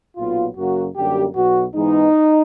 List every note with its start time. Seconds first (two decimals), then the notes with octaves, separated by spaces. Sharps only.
0.17 B1 A#2 F#3 B3 F4
0.57 F#2 C#3 F#3 A#3 F#4
0.96 F#2 D3 G3 A#3 G4
1.35 B1 B2 F#3 B3 F#4
1.75 G#2 E3 G#3 B3 D#4